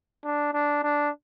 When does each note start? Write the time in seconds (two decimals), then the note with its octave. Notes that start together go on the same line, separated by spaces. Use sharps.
0.24 D4
0.53 D4
0.83 D4